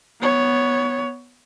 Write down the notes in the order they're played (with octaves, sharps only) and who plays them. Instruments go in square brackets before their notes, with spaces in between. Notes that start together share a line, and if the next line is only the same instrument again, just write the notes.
[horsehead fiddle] B3 C#5